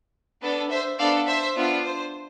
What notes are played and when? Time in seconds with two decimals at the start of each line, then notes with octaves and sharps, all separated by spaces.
0.42 B3 D4 A4
0.71 C5 E5
0.99 B3 D4 A4 D5 F5
1.27 C5 E5
1.56 B3 D4 F4
1.84 C5